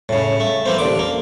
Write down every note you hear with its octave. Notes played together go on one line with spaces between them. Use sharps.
A2 C#3
A3
E3 A#3 C4
A1 D3 D6
A#3